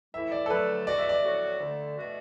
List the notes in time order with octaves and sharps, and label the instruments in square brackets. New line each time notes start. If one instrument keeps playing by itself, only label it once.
[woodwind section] A2 E3 A3 E4 [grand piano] E5
[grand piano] D5
A4
[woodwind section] D2 D3 F#3 A3 [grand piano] B4
[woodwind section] E2 B2 A3 F#4 [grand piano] D5
[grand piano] E5
D5
[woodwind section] A2 F#3 B3 F#4
D2 D3 A3
B2 A3 F#4